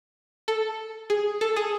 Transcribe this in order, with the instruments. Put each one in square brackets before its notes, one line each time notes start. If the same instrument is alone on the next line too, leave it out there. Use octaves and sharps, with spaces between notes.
[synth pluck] A4
G#4
A4
G#4